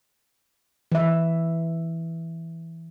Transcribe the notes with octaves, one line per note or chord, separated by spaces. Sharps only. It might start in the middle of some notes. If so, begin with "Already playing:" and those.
E3 E5